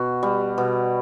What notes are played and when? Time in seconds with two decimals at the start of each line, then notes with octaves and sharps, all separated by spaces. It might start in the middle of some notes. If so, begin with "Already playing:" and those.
Already playing: B2 F#4
0.23 G3
0.58 B2